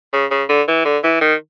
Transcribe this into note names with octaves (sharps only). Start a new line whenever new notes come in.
C#3
C#3
D3
E3
D3
E3
D#3